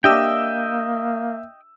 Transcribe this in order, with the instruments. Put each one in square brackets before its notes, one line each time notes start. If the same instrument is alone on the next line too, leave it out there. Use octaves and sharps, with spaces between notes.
[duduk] A#3 [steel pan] D4 G4 [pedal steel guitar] D#5 G5 [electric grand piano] E5 E6